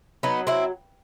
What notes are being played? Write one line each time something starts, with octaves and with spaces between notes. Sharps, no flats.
F#3 B3 D#4
C4 E4